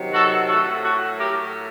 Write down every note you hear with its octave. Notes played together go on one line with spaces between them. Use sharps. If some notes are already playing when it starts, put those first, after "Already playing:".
Already playing: C3 D#3 F#3
F#4 A4
A2 F#3 F#4 A4
F#4 A4
A2 F#3 G4 A#4